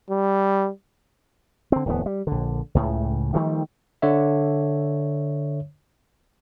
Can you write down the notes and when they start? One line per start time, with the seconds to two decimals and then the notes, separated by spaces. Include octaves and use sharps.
0.10 G3
1.72 D3 C4
1.86 D1 E2 B3
2.06 G3
2.27 A#1 D3
2.75 C#2 A2 C#3
3.34 D#3 F3 G3 A3
4.02 D3 C#5 E5